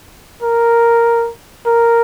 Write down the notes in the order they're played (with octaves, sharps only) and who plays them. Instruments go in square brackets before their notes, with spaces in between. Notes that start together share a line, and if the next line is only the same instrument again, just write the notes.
[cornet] A#4
A#4